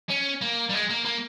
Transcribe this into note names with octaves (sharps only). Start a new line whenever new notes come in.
C#4
A#3
G3
G#3
A#3
A#3